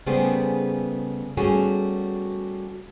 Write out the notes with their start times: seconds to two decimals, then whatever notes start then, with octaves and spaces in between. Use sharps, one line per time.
0.06 C#3 G3 A3 B3 G#4 C5
1.37 G3 A3 B3 C#4 F#4 G#4